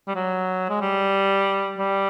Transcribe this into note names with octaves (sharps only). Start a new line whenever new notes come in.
G3
F#3
G#3
G3
G3